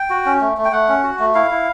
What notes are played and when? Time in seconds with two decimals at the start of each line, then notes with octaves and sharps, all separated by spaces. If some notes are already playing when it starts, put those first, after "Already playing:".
Already playing: G5
0.10 F#4
0.26 C#4
0.41 A3
0.57 A3
0.65 G5
0.72 A3 F#5
0.88 C#4
1.04 F#4
1.19 A3
1.35 E4 F5
1.51 E4